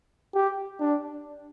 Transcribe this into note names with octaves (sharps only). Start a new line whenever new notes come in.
G4
D4